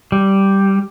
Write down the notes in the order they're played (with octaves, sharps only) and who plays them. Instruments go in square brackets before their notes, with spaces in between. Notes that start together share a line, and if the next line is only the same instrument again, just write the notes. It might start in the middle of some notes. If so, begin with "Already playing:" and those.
[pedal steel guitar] G3